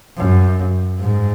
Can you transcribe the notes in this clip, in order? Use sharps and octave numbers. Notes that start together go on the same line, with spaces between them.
F#2
G#2